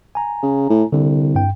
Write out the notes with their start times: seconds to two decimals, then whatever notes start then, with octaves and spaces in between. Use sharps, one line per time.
0.15 G#5 A#5
0.43 C#3
0.70 A2
0.92 C2 D3
1.35 G2 G5